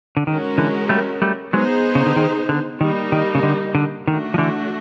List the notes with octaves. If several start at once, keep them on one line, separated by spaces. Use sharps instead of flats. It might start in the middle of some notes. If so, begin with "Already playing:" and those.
D3
D#3 G#3 C#4 F#4 A#4
D3 E3
G3 A3
G3 A3
F#3 G#3 B3 D#4 G#4 C5
C#3
D3
D#3
D3
D#3 G3 A#3 D#4
D#3
C#3
D3
D3
D#3 A3 D4 F#4
F3
D3 E3